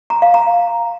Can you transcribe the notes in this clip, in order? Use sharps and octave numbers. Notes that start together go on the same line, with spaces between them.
A#5
F5
A#5